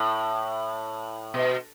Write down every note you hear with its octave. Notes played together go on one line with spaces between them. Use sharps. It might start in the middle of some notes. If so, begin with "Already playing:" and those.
Already playing: A2
B2